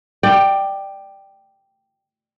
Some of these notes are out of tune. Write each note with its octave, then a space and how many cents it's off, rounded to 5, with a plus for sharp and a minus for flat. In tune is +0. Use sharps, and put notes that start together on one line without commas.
D5 +20 G5 +0